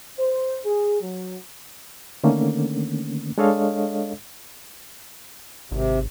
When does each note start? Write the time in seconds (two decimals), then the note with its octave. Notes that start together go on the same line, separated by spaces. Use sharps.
0.18 C5
0.65 G#4
1.01 F#3
2.24 D3 D#3 A3 A#3 C#4
3.38 G#3 D4 A4 C#5 D#5 F5
5.72 G#1 C3